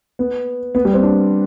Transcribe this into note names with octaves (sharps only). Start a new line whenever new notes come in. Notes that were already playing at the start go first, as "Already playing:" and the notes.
B3
B3
G3
C4
D4